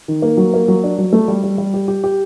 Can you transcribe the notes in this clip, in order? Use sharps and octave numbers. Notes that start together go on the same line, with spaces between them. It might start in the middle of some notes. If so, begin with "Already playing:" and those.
D#3
A#3
F#3
A#3
F#3
D4
F#3
A3
G3
G3
G3
G4
G4
G4